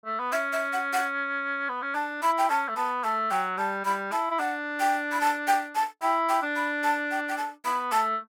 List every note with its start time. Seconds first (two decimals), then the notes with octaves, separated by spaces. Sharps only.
0.06 A3
0.20 B3
0.32 C#4 E5
0.53 E5
0.73 F#5
0.93 F#5
1.69 B3
1.82 C#4
1.95 D4 A5
2.23 E4 B5
2.38 G5
2.50 C#4 A5
2.68 A3
2.76 B3 A5
3.04 A3 A5
3.31 F#3 G5
3.58 G3 A5
3.85 G3 B5
4.12 E4 A5
4.31 E4
4.39 D4 F#5
4.80 G5
5.12 B5
5.21 A5
5.48 G5
5.75 A5
6.02 E4 G5
6.29 G5
6.43 D4
6.56 B5
6.84 A5
7.11 G5
7.29 G5
7.38 A5
7.65 B3 B5
7.92 A3 A5